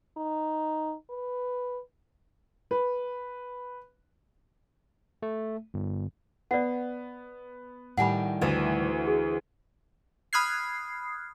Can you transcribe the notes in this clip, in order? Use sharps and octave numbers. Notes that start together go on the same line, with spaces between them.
D#4
B4
B4
A3
G1
B3 D5 F#5
A2 D#3 G3 F#5 G#5 B5
D2 E3 A3
F#4 G#4
B5 D#6 F6 F#6 G#6 C7